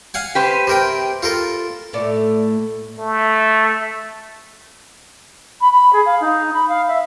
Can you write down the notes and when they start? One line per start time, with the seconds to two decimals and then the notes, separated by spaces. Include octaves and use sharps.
0.14 F5 F#5 G#5
0.35 G4 B4 C5
0.67 C3 A#4 G5
1.23 F4 A4 A#4
1.93 A2 A3 D5
2.99 A3
5.61 B5
5.72 B5
5.93 G#4
6.06 F5
6.21 D#4
6.53 B5
6.68 F5
6.88 E5